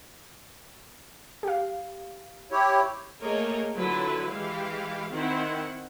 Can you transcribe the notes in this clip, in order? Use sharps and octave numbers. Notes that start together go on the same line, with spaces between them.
G4 F5
E4 G4 C#5
A3 A#3 G#4 A#4 C#5 D#5
D3 F#3 E4 F4 B4
E3 G#3 G4 F5
D#3 C4 E4 F#5